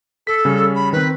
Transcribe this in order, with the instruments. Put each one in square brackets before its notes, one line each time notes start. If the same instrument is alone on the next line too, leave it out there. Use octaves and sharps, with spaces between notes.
[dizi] A4 [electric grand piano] B6
[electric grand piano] C#3 G3 C#4
[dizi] B5
[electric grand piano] D#3 C4 [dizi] B4